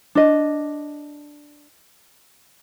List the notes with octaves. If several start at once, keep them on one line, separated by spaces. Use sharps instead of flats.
D4 D#5